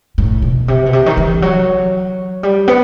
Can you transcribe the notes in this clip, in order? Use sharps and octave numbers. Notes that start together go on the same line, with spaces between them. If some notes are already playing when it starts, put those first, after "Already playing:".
A2
B2
C3
B2
C3
D#3
E3
F#3
G3
B3